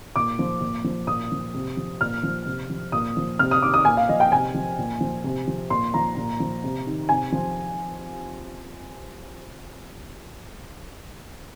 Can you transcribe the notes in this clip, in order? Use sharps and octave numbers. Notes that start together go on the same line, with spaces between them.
A#2 D6
F3
A#2
F3
A#2 D#6
F3
C3
F3
A#2 F6
F3
C3
F3
A#2 D#6
F3
C3 F6
D#6
D#3 D6
D#6
A#2 G#5
F5
F3 D#5
G5
C3 G#5
F3
A#2
F3
C3
F3
A#2 C6
F3 A#5
A#2
F3
C3
D#3
C3 G#5
F3